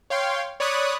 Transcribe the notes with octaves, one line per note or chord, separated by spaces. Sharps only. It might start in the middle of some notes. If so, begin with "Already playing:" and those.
C#5 F5 G5 C6
C#5 D5 B5 C#6 D#6 F#6